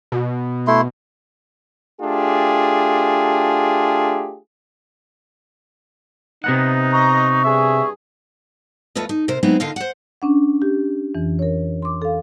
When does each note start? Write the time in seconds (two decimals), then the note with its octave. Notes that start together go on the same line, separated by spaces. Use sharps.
0.12 B2
0.67 A3 E4 C6
2.02 A3 D4 F4 G4 G#4
6.44 C3 B3 D#4 F#5
6.92 D#5 A#5 C#6
7.44 G2 G#4 E5
8.95 E2 A3 F4 B4 D#5
9.09 D#4
9.28 C3 A#4 C5
9.43 F#3 G#3 B3 C4 D#4 E4
9.60 D3 D#3 F4 D#5 F5
9.76 C5 F#5
10.22 C#4 D4 F#5
10.62 G4
11.15 F2 E3
11.39 A#4 C#5
11.82 C6 D6
12.02 A4 F5